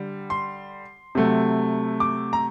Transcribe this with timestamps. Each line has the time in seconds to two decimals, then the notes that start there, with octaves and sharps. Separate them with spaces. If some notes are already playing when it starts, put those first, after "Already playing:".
Already playing: D3 G3
0.30 C6
1.15 C3 F#3 A3
2.00 D6
2.33 A#5